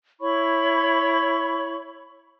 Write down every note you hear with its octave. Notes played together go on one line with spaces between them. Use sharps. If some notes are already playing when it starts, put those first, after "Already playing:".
E4 C#5 B5 C#6